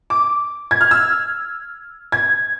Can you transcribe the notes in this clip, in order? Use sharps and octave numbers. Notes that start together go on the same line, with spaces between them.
D6
G#6
F6
E6
G#6